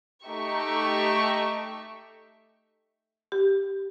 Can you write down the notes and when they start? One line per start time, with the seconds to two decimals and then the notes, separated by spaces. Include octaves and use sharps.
0.25 A3 D#4 G4 E5 C#6
3.32 G4